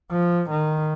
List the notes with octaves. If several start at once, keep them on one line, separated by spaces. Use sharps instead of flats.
F3
D#3